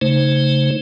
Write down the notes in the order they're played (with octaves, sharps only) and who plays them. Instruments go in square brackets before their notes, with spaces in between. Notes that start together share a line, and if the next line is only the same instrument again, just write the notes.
[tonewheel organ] C#3 A3 D#4 C5